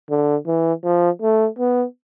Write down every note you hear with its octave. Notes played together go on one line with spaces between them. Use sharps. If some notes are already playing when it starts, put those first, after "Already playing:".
D3
E3
F3
A3
B3